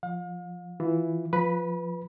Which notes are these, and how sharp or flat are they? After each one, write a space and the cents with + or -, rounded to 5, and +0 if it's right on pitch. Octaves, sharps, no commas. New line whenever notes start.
F3 +0 F5 +40
E3 +0 F4 +0
F3 +0 B4 +0 B5 -35